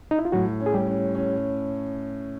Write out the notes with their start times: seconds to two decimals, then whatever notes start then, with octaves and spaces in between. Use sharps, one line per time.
0.11 D#4
0.19 E4
0.25 F4
0.32 A2 F#3 F#4
0.60 C#4
0.66 G#4
0.74 G3 G4
0.88 C#4
1.15 C#4